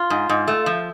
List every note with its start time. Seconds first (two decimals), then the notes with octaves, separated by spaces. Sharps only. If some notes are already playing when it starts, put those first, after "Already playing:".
Already playing: F4
0.10 G#2
0.29 G#2
0.48 A3
0.66 F3